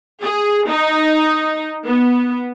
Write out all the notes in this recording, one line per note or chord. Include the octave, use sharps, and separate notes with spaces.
G#4
D#4
B3